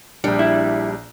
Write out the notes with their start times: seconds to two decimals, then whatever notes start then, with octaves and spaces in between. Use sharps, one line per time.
0.24 A#1 G3 D4
0.39 E4